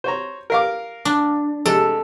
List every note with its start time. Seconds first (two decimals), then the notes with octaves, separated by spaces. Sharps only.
0.04 C5 C#5 A#5
0.50 A#4 F5 D6
1.05 D4
1.66 C3 G#3 A4